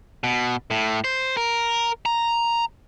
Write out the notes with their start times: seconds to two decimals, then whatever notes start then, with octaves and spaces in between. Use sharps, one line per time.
0.24 B2
0.70 A2
1.04 C5
1.37 A#4
2.06 A#5